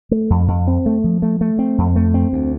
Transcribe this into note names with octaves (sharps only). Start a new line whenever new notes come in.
A3
F2
F2
C4
A3
F3
A3
A3
C4
F2
A3
C4
D2